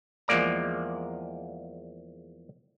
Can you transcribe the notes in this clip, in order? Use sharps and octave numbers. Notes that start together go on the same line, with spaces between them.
E2 F3 G#3 A#3 D5 A#5